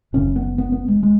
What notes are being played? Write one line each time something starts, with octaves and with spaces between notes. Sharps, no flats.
F#1 F#2 C#3 C#4
B3
B3
B3
G#3
G#3